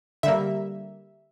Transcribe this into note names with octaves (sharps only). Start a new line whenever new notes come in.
D3 G3 A#3 E5